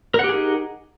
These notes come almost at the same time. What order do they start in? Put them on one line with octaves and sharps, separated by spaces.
A#4 F#5 G4 G#4 D#4